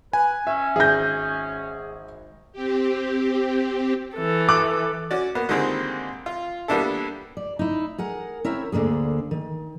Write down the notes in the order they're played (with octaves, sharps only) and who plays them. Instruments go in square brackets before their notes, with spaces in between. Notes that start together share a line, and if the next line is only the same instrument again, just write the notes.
[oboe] B4 [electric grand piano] G#5
[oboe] C#4 [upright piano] E5
[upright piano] G#1 A#6 [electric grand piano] G#4 [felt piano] E5 G6
[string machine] C4 G4
[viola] E3 A4
[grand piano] D6 F#6
[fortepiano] C#4 F#4 D5
A#3 B3
D3 D#3 G3 G#3 A#3 C4
F4
G3 A#3 B3 D4 E4 A4
[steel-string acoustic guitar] D5
D#4 E4
G#4 A#4 F#5
C4 E4 A#4 C#5 E5
D2 D3 D#3 A#3 G#4
D#3